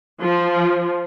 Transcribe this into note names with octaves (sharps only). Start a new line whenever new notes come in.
F3